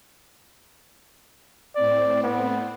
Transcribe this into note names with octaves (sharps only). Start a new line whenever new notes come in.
A2 C4 D5
B3